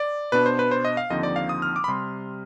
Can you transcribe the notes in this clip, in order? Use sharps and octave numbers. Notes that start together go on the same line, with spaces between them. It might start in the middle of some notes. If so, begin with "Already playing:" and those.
Already playing: D5
B2 B3 D4 B4
C5
B4
C5
D#5
F5
D#2 D3 F3 C4 D#4 D#5
D5
F5
D#6
F6
D6
B5
C3 G3 C6